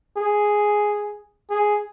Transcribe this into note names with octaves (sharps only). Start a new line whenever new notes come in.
G#4
G#4